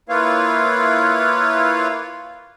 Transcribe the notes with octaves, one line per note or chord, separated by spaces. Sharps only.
A#3 E4 F4 B4 C#5 F5